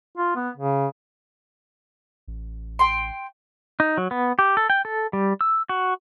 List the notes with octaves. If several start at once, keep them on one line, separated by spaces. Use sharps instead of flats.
F4
B3
C#3
A1
G5 C6
D#4
F#3
B3
G4
A4
G5
A4
G3
E6
F#4